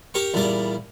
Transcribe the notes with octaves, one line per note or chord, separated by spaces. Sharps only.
G4 A#4 G5 C#6
E2 A#2 G3 A#4 D6